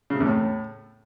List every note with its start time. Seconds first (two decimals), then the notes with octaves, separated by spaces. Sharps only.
0.10 C#3
0.15 C3
0.20 E2
0.25 A2